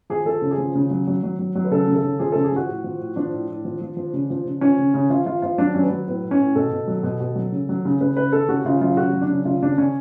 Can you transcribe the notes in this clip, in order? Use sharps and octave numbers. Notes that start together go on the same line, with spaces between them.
F3 G#4
F3 A4
C#3
G#4
F3
C#3
F#3
F#3
F#3
F#3
F#3
B4
C#3 A4
C#3
A4
C#3
F3 G#4
C#3 A4
G#4
F3 F#4
A2
F3
A2
F3 D4
A2
A2
F3
F3
F3
C#3
F3
C#3
F3 C#4
C#3
C#3
F3 F4
F3 F4
F3 F4
F#3 D4
F#3 C#4
B3
F#3
A2 B3
A2
C#4
A2
B2 A4
B2
F#3
B2
B2
F#3
C#3
F#3
C#3
C#3 B4
C#3 B4
C#3 A4
C#3 F#4
C#3 F4
F#3 F4
C#3 F#4
F#3
D4
C#3
C#3 F4
C#3 D4
C#3 C#4